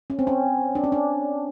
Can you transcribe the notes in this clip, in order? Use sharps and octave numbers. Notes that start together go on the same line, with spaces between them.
C#4
C4
C#4
D4
C#4
D4